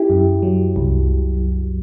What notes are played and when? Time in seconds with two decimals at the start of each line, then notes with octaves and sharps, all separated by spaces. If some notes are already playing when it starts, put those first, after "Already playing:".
Already playing: E4 G4
0.10 F#2
0.43 F#3
0.76 C2